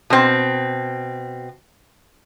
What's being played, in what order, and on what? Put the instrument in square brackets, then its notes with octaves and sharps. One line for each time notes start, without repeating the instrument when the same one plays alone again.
[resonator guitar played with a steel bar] B2 C4